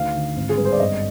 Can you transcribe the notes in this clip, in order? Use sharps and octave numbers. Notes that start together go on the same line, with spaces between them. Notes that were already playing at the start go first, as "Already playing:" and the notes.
Already playing: D2 D#3 F5
D3
G#1
G#4
G2 B4
C5
D5
G1 D#5